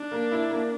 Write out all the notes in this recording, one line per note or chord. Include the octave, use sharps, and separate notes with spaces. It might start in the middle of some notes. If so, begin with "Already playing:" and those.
Already playing: D4
A#3
E4
A#3